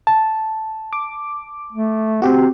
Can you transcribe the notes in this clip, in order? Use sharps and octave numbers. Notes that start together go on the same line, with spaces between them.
A5
D6
A3
C4 F#4 G4